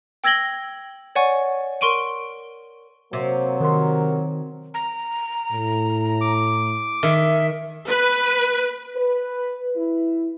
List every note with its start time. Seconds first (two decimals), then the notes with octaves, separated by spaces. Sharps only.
0.24 G5 E6 G#6 A#6 F#7 G7
1.15 C#5 D5 F#5 G#5 C#6
1.81 A#4 C6 C#6 D7 D#7
3.13 C3 F#3 A#3
3.60 D#3 F#4 A#4 C6
4.74 A#5
5.51 A2
6.21 D6
7.03 D#3 E5
7.87 B4
8.96 B4
9.75 E4